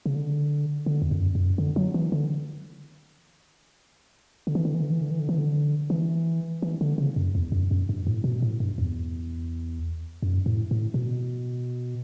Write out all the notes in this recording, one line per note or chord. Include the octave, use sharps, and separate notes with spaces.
C#3
D3
D3
E2
F#2
F#2
D3
F#3
E3
D3
D3
E3
D3
E3
D3
E3
D3
E3
D3
E3
D3
E3
E3
D3
C#3
F#2
E2
F#2
F#2
G2
A2
B2
A2
G2
E2
F#2
A2
A2
B2